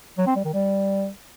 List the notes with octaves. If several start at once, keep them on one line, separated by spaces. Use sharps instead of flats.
F#3
C4
G3
D#3
G3